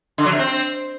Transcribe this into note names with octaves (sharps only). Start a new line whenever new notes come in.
D3
F#3
C3
C4